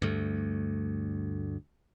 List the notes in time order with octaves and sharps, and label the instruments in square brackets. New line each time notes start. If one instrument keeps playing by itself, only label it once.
[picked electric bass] D2 G2 A3